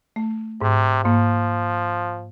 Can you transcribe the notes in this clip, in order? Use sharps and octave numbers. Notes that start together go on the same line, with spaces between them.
A3
G#2 C3
G#2 F3 A#3